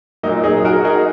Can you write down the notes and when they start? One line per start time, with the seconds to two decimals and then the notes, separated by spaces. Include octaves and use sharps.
0.23 A#2 F#3 A#3 D#4
0.44 D#4 G#4
0.64 F#4 A#4
0.84 D#4 G#4